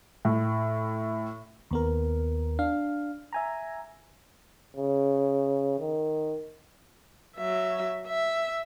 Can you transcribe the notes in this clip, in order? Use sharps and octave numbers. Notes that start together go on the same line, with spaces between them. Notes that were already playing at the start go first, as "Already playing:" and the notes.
A2
D#2 B3 A#4
D4 F5
E5 G#5 A#5
C#3
D#3
F#3 E5
E5